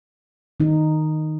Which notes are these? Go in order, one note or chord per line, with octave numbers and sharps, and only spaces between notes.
D#3 D#4